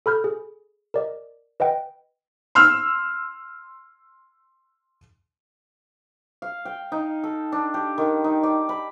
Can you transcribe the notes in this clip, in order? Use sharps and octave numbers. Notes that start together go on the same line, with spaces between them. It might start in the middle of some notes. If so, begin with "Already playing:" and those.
A4 B5 F6 G6
G#4
A#4 D5 D#5
B4 D#5 F#5 G5
C6 E6 F6
F5
G5
D#4
A4
D4
G4
D#3
D#4
D5
B5